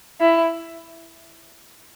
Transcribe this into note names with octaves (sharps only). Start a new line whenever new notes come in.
E4